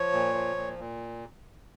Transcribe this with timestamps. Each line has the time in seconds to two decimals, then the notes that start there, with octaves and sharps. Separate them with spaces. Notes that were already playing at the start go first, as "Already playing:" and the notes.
Already playing: F3 C#5
0.12 A#2
0.33 F3
0.56 A#2
0.78 A#2